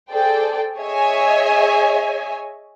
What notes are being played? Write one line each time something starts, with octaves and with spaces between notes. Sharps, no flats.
G#4 A4 C5 D5 G5
G#4 C#5 D#5 E5 G#5